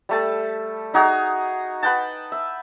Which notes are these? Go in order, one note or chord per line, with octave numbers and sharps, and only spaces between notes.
G3 A3 A5
D#4 F#4 G#4 A#5
B4 F#5 G5 A5
E5